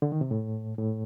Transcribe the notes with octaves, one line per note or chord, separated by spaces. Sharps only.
D3
D#3
C3
A2
A2